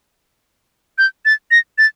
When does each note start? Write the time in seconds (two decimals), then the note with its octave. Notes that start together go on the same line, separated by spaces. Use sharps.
0.98 G6
1.25 A6
1.51 A#6
1.78 A6